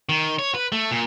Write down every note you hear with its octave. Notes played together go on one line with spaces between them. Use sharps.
D#3
C#5
B4
A3
A#2